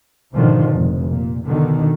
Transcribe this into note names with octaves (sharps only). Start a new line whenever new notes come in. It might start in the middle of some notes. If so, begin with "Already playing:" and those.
G#2 B2 D3 D#3 F3
F1
A#2
B2 D3 D#3